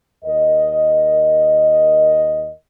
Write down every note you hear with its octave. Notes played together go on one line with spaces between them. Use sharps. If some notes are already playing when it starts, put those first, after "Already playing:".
D#2 A#4 D#5